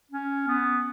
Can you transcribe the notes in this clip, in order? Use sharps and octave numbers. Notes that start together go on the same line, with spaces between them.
C#4
B3